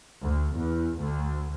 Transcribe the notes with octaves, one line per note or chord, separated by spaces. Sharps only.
D2
E2
D2